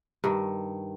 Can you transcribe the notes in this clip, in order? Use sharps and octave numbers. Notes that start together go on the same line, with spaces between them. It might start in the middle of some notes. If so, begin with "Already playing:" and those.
G2 D#3